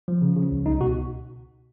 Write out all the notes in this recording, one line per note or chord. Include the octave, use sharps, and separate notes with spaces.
F3
C#3
C#3
C#2
C2 D#4
B2 F#4